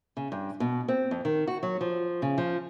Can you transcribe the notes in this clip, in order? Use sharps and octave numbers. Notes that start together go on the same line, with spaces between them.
C#3
G2
B2
C4
F2
D#3
F#4
F#3
F3
C#3
F3